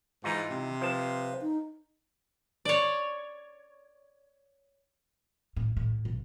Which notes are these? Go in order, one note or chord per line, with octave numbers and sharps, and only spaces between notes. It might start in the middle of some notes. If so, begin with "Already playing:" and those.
G#2 E3 D#4 F4
C3
F3 B4 C5 F5 A5
D#4
C#5 D5
A2
A2
B1